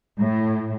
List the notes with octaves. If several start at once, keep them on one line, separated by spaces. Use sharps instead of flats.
A2